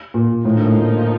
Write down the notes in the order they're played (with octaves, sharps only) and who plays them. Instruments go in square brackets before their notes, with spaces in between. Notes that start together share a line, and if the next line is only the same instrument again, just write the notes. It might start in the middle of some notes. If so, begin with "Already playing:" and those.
[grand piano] A#2
[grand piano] A2 [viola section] F3 A#3 D#4
[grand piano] D3
A2
A2